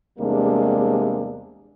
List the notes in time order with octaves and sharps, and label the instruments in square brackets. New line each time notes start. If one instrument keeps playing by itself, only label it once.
[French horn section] E2 C3 G3 G#3 A#3 D4